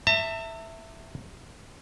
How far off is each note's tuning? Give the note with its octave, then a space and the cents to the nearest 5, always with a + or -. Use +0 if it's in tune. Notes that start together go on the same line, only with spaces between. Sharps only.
E5 +0 A5 +45